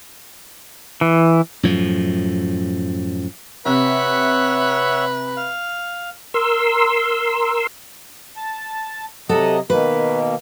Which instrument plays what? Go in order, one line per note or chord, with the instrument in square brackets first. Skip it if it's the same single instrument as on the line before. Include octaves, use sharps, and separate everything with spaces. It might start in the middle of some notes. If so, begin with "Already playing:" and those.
[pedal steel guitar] E3
[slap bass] F#2 A2 F3
[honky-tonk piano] C3 [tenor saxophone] B4 [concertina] C#5 E5 F#5
[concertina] F5
[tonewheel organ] A#4 C6 E6
[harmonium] A5
[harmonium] C3 F#3 D#5 [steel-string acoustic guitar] A4 F#5
[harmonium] B2 D#3 A#3 [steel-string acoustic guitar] B4